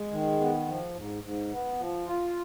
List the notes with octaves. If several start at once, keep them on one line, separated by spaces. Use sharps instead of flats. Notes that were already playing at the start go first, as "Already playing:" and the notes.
Already playing: G#3
D#3
B3
F3
G#2
G#2
B3
F3
F4